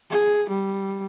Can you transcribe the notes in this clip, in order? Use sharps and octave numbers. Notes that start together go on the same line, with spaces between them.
G#4
G3